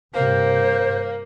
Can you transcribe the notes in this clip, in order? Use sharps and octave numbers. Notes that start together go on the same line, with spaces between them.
G2 C3 A#3 C5